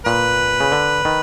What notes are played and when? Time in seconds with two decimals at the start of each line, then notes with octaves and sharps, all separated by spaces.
0.06 A#2 B4
0.60 C#3
0.72 D3
1.05 D#3